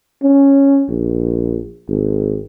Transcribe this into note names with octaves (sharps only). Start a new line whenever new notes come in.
C#4
A#1
G#1